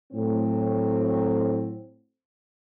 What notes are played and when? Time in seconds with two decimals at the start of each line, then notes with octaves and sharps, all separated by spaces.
0.12 A2 F#3 C4